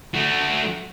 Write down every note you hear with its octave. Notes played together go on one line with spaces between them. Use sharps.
A3 F#4